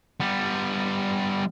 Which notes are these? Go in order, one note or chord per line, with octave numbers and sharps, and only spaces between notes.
G3 B3